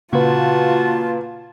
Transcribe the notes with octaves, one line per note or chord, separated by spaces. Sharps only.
A#2 C#3 F4 F#4 B4 A5